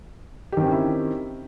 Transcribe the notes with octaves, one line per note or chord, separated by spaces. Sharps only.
D#3 C4 C#4 E4 G4